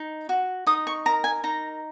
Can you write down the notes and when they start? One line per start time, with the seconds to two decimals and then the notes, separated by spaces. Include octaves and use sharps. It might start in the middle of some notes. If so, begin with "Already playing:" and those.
Already playing: D#4
0.29 F#4
0.67 D#4 D#6
0.87 C#6
1.06 A#4 A#5
1.24 G#5
1.44 D#4 A#5